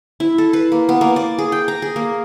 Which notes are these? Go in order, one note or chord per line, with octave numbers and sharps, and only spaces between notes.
E4
A4
B4
A#3
B3
A#3
D5
G#4
G5
A#5
G#4
A#3